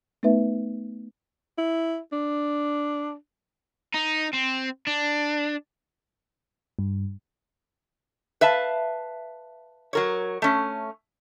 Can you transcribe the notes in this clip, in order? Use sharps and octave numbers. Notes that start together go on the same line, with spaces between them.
A3 B3 D#4 B4 E5
E4
D4
D#4
C4
D4
G2
B4 E5 F5 A5
F#3 A#4 C#5
A3 C#4